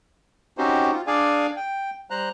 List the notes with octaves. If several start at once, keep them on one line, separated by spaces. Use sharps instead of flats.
C4 C#4 D#4 F#4 G4 C5
F4
D4 G#4 D5 F5 G#5
G5
G3 C5 A#5 F#6